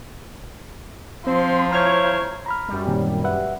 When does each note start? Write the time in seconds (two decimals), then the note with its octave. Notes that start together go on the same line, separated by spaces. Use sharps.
1.27 F3 C4 C6
1.72 E4 C5 C#5 A#5 F6
2.46 A#5 B5 F6
2.68 F#2 G3
2.87 A#2 D#3 C4
3.24 B4 E5 F#5